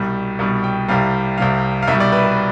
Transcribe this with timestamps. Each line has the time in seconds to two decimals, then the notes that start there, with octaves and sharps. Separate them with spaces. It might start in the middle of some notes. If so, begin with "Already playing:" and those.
Already playing: C2 B2 G3
0.39 C2 B2 G3
0.64 G5
0.88 C2 C3 G3 F5
1.38 C2 C3 G3 F5
1.82 F5
1.88 C2 B2 G3 E5
2.00 D5
2.12 B4
2.24 B4